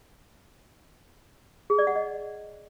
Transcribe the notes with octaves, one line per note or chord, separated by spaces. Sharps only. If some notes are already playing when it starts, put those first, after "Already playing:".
G#4
D5
F#5
D#5